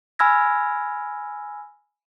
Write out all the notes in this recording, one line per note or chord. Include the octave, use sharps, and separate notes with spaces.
G#5 B5 E6 F6 G#6 A#6